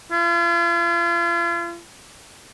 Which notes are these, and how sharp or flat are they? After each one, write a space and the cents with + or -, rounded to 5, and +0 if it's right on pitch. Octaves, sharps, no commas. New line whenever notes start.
F4 -40